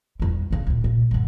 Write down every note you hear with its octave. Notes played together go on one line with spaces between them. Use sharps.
E2 G3
C#3 C#4
D2 A#2
A#2
G2 D3